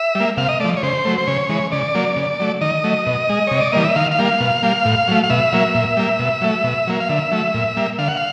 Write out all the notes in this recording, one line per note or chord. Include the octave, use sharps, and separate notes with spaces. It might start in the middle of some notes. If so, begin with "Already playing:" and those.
Already playing: E5
G3 A#3
C3 F5
D#5
F3 A3 D5
C#5
C#3 C5
F#3 A3
C5
C#3 C#5
E3 G#3
C#3 D5
F#3 A#3
C#3
F#3 A3
D#3 D#5
F#3 A3
B2
G#3
C3 C#5
D5
E3 G3 A#3 D#5
E5
D#3 F5
F5
G3 A#3
F5
B2
G3 A#3
A2
F#3 A3
F5
B2 E5
F#3 A#3
A#2
G3 A#3
B2
F#3 A3
B2
F#3 A#3
F5
D3 E5
F#3 A3
A#2
G3 A#3
D3 F5
F#5
F5